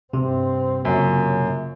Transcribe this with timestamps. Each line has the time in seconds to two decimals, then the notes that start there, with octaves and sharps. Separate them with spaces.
0.13 G2 C3 C4
0.85 F#2 A#2 C#3